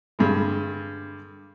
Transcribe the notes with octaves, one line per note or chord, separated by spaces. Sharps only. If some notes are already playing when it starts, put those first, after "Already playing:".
G2 D3 G#3